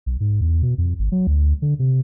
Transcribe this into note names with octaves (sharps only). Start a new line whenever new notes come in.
B1
G#2
E2
B2
F2
G#1
F#3
D2
D3
C3